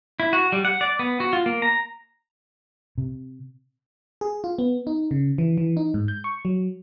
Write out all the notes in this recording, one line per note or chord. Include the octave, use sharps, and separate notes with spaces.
E4
F#4
G3
F#5
D5
B3
F#4
F4
A#3
A#5
C3
G#4
F4
B3
D#4
C#3
E3
E3
D#4
G#2
G6
C#6
F#3